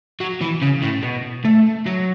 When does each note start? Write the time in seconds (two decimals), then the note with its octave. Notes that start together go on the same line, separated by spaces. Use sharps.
0.20 F#3
0.41 E3
0.61 C#3
0.82 A2
1.03 B2
1.45 A3
1.86 F#3